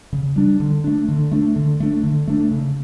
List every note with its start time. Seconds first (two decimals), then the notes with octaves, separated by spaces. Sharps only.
0.13 C#3
0.36 G3 D4
0.60 D3
0.84 A3 D4
1.08 D3
1.31 A3 D4
1.56 D3
1.80 A3 D4
2.03 D3
2.27 A3 D4
2.51 C#3